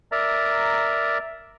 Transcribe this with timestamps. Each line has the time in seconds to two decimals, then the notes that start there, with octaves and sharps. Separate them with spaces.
0.12 A#4 D5 E5 A#5